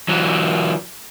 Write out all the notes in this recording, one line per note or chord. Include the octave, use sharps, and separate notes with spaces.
E3 F#3